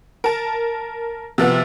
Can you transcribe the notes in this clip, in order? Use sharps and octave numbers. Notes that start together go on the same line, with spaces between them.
A#4 A5
C3 F3 B3 F#4